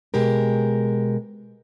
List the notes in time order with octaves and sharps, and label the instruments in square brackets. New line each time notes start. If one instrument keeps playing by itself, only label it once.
[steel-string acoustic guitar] B2 G#3 G4 A#4